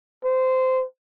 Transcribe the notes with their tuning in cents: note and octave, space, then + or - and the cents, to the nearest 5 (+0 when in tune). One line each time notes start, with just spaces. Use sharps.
C5 -15